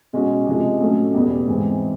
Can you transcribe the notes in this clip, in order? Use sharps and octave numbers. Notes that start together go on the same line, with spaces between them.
B2 G#3 C#4 F#4
C3 F3 G#3
A2 F#3 A3 C#4
E2 B2 G3 B3
G#2 E3 G#3 C4